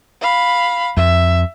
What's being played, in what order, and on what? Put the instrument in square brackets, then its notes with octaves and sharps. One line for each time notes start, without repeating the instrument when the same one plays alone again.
[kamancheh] F5 B5
[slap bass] F2 [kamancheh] E5